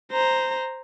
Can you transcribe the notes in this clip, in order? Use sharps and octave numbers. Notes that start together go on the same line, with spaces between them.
C5 A#5